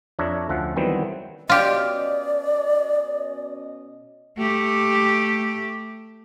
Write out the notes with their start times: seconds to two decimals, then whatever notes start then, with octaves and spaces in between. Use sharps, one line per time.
0.19 F2 D4 C#5 E5 A#5
0.49 D2 F3 C#4 E5 F#5
0.76 D#3 E3 F#3 G3 B3 C4
1.49 B2 C#4 F4 G4 D5 D#5
4.38 A3 G4